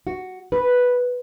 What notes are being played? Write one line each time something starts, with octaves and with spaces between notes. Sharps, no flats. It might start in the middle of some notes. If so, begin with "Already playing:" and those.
F#4
B4